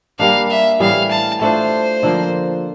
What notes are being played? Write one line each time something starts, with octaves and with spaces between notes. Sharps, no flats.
G3 A#3 D4 F5
E5
A2 E3 G3 F5
A5
A3 D4 F4 C5
D3 F3 A#3